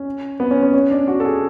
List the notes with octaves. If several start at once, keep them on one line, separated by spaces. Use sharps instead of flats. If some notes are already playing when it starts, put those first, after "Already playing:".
Already playing: C#4
B3
C#4
C#4
C#4
D4
F#4
A4
G#4